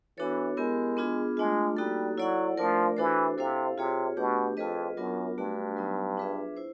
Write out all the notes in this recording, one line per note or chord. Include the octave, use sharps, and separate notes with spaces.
E3 B3 D4 F#4 A4 C#5
G#3 B3 E4 G4 A#4
B3 D4 F4 G#4
G#3 A3 D4 F4
G3 A#3 D#4 F#4 A4
F#3 E4 A4 D5 F#5
F3 A3 D4 F4 A#4 D5
E3 D4 F#4 A4 C5
C3 E4 A4 C5 F5
C3 F4 G#4 C#5
B2 A3 D4 G4
F2 F4 G#4 B4 D#5
F#2 F#3 B3 D4 F4 A#4
G2 A3 D4 F#4
F#3 B3 D#4
D4 F4 G#4 B4 E5
E4 C5